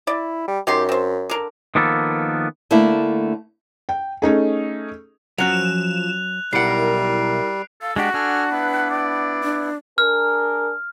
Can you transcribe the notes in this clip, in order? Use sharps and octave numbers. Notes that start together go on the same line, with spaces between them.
E4 D5
G3
F#2 D#3 G4 C6
C4 C5
D3 A#4
D#3 F3 A#3 B3 A4
D3 A3 A#3 D4 E4
G5
A3 C#4 D#4 G#4
F3 F#3 C#4 F#4 F#6 E7 F7
B1 G3 E4 A#4 F#5 C7 D7
A4 F5
G#3 D4 F#4 G4 F#5
D4 A4 G#5 F6
B3 E4 B4
D5
D4
D4 G#4 A#4 F6